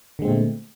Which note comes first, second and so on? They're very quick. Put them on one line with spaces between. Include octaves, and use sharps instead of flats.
D3 G#3 C4 A#2 A3